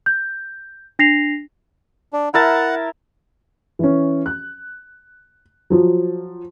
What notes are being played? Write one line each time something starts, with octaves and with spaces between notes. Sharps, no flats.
G6
D4 A#6 C7 F7
D4
E4 A#4 F#5 A5
E3 C#4
F#6
F3 F#3